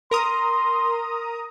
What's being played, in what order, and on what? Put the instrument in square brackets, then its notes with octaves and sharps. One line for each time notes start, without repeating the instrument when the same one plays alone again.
[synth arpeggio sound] A#4 A#5 D#6 [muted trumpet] C6